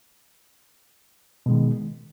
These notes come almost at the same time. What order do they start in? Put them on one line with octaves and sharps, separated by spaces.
B2 G#3 D#3